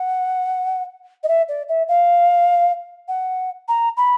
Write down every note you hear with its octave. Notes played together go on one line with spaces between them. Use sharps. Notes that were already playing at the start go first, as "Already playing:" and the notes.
Already playing: F#5
D#5
E5
D5
E5
F5
F#5
A#5
B5